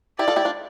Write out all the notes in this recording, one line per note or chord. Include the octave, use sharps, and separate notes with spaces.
E4 G4 D5
F4 A4
E4 G4
D4 F4